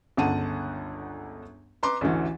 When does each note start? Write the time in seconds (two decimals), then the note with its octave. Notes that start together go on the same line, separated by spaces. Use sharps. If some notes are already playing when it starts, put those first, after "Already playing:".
0.17 G1 C#2 D3 F#5 A5 D#7
1.83 B4 A#5 C6 D6
2.01 A1 D2 E3